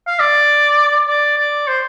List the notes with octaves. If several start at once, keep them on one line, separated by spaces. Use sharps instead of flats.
F5
D5
D5
D5
C5